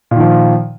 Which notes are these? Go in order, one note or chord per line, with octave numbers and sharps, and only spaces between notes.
A#2 D#3 F3